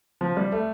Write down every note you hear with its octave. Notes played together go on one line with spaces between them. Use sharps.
F3
G3
A3